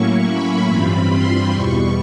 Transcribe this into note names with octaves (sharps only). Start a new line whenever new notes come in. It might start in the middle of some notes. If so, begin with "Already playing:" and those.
Already playing: A2 F#3 A#3 C#4 E4 C#6
B5
G2 E3 G3 C4 F4 B5
C6
E2 B2 G3 C#6